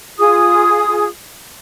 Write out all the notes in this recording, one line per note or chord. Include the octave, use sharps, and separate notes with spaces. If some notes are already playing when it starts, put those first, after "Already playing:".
F4 G#4 D#6